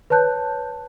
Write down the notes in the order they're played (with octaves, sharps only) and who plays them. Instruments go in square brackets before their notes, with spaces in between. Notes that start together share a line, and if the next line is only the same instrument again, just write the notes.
[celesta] B4 C#5 A5 F#6 G6